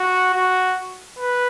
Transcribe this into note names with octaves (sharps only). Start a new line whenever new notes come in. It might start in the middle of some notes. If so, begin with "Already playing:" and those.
Already playing: F#4
F#4
B4